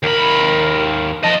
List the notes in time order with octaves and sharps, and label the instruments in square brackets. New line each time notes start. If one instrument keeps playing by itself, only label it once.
[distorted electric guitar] D#2 B5 [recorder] A#4
[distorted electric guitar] F3 D#5 [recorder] A5